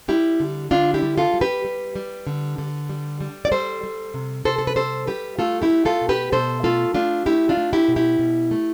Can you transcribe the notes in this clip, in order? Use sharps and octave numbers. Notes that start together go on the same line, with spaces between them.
G3 E4 G4
D3
D3 D4 F4
E4 G4
G3
F4 A4
G3
G4 B4
G3
G3
D3
D3
G3
G3
D5
G3 A4 C5
G3
C3
C3 A4 C5
A4
B4
G3 A4 C5
G3 G4 B4
A3 F4 A4
E4 G4
A3
F4 A4
B2
G4 B4
B2 A4 C5
A3 F4 A4
A3 D4 F4
A3 E4 G4
D4 F4
A3
E4 G4
B2
E4 G4
B2
A3